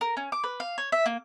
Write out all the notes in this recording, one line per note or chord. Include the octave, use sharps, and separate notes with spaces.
A#4
C#4
D6
B4
F5
C#5
E5
A#3